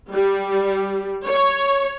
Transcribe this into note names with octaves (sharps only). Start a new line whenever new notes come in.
G3
C#5